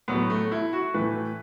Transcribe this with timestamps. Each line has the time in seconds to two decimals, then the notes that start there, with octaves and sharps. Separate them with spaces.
0.08 A2 F#3 A3 B3
0.30 A3
0.52 E4
0.73 F#4
0.94 A2 E3 A3 B4